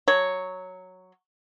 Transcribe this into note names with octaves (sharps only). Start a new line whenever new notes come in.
F#3 C#5